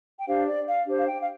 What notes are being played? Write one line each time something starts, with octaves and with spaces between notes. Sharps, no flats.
G5
D4 G4 C5 F5
D5
F5
D4 G4 C5
F5
G5
F5